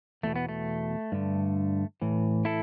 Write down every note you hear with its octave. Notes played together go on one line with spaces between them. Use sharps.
E2 B2 A3
B3
A3
G2 D3
A2 E3
E4 A4